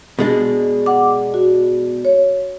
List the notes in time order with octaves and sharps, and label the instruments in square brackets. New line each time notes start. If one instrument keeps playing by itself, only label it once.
[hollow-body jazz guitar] B2 G#3 D4
[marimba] F#5 D6
F#4
C#5